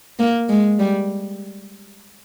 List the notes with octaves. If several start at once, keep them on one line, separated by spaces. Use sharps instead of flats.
A#3
G#3
G3